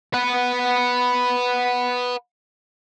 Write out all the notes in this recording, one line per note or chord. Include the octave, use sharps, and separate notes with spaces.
B4 F#5